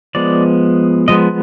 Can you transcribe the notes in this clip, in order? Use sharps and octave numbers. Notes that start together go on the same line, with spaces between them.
F3 G#3 B3 D5
F3 G#3 B3 D#5